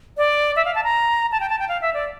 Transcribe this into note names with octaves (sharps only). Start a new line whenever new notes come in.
D5
E5
F5
A5
A#5
A5
G5
A5
G5
F5
E5
D5